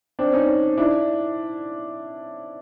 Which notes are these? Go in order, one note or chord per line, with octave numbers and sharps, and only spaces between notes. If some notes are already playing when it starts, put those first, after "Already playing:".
C4 D4
C#4 D#4
D4 E4